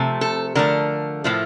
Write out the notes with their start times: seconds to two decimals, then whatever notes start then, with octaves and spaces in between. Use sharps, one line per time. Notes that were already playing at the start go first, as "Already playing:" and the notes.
Already playing: C3 F3 A3
0.21 A4
0.55 D3 F3 A3 A#4
1.24 A2 F3 A3